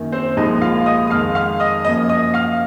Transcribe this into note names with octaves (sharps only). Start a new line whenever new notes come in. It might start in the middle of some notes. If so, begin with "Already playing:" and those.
Already playing: F#2 D#3 A#3
C4 C5
C2 A#2 F3 G#3 D#4 D#5
F4 F5
D#5 D#6
D#6
F2 D#3 G#3 F5 F6
F5 F6
D#5 D#6
F#2 F3 A#3 D#5 D#6
D#5 D#6
F5 F6